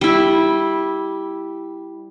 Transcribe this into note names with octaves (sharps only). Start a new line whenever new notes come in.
G3 E4